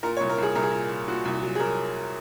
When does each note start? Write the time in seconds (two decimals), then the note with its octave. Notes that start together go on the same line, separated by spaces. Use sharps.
0.03 A#2 A#4
0.17 C#5
0.20 C2
0.29 A#4
0.38 C2 G#4
0.55 C2 A#4
0.63 G#4
0.72 A#2 A#4
0.90 A#2
1.08 A#2 F#4
1.25 C2
1.42 F#3
1.55 G#4
1.60 F#3 A#4